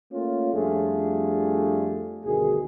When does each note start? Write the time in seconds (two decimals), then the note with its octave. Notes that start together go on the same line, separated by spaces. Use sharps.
0.13 A3 A#3 C#4 F4
0.54 F2 G3 A3 D4 F4 G#4
2.26 D2 G2 B2 D#3 G#4